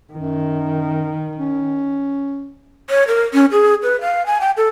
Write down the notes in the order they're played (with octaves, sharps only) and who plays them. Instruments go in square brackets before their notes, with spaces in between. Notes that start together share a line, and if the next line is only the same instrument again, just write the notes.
[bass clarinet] F#2 [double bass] D#3
[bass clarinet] C#4
[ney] C#5
A#4
C#4
G#4
B4
F5
G#5
G5
A4